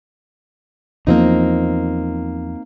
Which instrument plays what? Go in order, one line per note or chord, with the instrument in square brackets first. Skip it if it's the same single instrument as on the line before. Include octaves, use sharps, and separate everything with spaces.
[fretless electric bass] E2 F3 [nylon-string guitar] A#3 C4 D#4